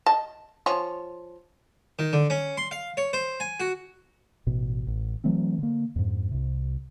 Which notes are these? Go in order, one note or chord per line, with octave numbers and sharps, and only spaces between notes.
D#5 A5
F3 C#5 G#5
D#3
D3
C#4
C6
F5
C#5
C5
G#5
F#4
A1 B2
A1
E3 F#3 A3 C4
D3 A#3
F2 G#2
C2 C3